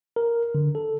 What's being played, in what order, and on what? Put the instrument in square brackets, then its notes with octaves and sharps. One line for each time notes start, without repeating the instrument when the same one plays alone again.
[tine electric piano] A#4
D3
A4